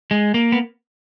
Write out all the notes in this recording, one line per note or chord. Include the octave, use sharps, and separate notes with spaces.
G#3
A#3
B3